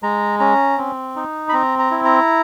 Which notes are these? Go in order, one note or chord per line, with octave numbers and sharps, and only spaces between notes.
G#3 A#5
C#4 A#5
C4
D#4
B5
C4 A#5
A#5
E4
A#5